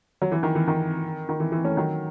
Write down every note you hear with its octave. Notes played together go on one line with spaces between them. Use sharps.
F#3
E3
D#3
E3
D#3
D#3
E3
E3
A3 C#4
D#3 F#3